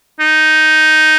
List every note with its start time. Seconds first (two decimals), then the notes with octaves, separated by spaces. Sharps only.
0.20 D#4